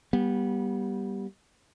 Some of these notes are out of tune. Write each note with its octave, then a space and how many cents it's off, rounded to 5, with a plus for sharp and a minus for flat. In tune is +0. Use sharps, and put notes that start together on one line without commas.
G3 +0 B3 -30